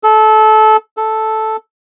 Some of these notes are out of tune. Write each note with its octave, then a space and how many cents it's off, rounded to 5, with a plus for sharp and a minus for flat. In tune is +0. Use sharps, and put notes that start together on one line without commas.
A4 -20
A4 -5